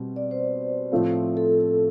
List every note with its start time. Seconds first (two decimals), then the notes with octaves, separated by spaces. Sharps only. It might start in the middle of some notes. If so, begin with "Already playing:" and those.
Already playing: B2 G3 C4
0.16 D5
0.31 C5
0.92 A2 F3 A3 C4 F4
1.37 A4